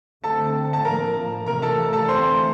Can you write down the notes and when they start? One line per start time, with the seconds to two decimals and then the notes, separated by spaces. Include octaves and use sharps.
0.23 D3 A3 C4 A4 A5
0.73 A5
0.85 A2 F3 A#3 A#4 A#5
1.46 C3 E3 A3 A#4 A#5
1.62 A4 A5
1.93 A4 A5
2.08 E3 A3 C4 C5 C6